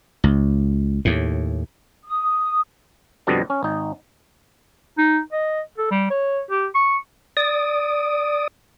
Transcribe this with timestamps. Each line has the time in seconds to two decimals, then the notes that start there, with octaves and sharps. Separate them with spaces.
0.24 C#2
1.05 D#2 A2
2.05 D#6
3.27 F2 B2 D3 G3 D4 D#5
3.50 C#4
3.63 G#1 D#4
4.98 D#4
5.32 D#5
5.78 A4
5.91 G3
6.10 C#5
6.51 G4
6.75 C#6
7.37 D5 D#6